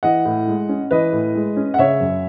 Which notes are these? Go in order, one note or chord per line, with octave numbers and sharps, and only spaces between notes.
E3 D#5 F#5
A2
G#3
C#4
E3 B4 D#5
A2
G#3
C#4
F#5
C#3 C#5 E5
F#2